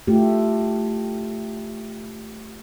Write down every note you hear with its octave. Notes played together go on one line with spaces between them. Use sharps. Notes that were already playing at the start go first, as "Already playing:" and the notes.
A3 F4 G4